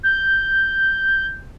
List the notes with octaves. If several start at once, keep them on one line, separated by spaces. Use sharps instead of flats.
G6